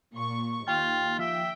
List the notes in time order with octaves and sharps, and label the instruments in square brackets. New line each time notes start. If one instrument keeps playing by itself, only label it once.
[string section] A#2 C#6
[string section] D#2 [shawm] F4 [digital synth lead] G5
[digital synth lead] F3 [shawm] E5 [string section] G5